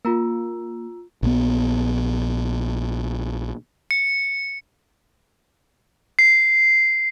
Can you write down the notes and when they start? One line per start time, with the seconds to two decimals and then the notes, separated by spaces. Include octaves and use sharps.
0.05 A#3 F4 A#5 E6
1.23 A#1 B3
3.91 C#7
6.19 C7